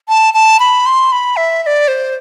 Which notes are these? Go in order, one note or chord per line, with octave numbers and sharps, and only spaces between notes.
A5
A5
B5
C6
B5
E5
E5
D5
C5